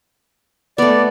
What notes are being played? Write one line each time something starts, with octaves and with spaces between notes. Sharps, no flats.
A3 B3 D5